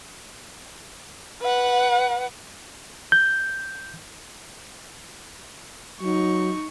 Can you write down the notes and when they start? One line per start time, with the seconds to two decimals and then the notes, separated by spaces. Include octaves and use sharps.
1.42 B4 F#5
3.12 G6
6.01 F#3 D#4 C#6